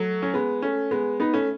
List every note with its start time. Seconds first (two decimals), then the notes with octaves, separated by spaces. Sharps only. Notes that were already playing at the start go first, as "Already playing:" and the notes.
Already playing: F#3 A3
0.22 C#4
0.34 G#3 B3
0.62 A3 C#4
0.91 G#3 B3
1.20 B3 D#4
1.34 A3 C#4